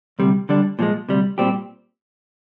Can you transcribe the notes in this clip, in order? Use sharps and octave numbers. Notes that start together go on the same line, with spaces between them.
D2 C3 G3
D3 G3 D4
A#2 F3 G#3
D2 C3 G3
A#2 G3 C4 G4